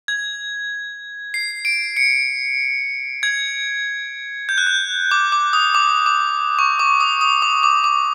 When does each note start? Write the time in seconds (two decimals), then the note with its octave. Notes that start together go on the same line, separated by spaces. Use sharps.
0.08 G#6
1.34 C7
1.65 D7
1.97 C#7
3.23 G#6
4.49 G6
4.58 F#6
4.67 G6
5.11 D6
5.32 D6
5.53 D#6
5.75 D6
6.06 D6
6.59 C#6
6.79 D6
7.00 D#6
7.21 D#6
7.42 D6
7.63 D6
7.84 D6